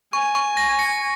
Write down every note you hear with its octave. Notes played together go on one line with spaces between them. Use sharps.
G#5 C#6
C#6
A#6
A#6 C#7